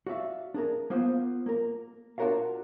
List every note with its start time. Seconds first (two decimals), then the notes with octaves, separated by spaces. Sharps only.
0.07 F#4 D5 E5 F5
0.54 D4 G#4 A#4
0.90 A#3 B3 F4 C5
1.46 A#3 A#4
2.18 D4 F4 F#4 A#4 C#5 F5